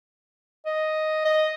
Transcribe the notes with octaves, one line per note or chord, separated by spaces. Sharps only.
D#5
D#5